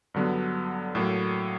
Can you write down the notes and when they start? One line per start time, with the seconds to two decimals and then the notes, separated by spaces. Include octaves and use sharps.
0.14 G2 D3 F#3 B3
0.95 A2 F#3 A#3 A4